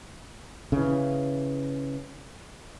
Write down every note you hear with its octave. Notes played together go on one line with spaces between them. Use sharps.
C#3 E3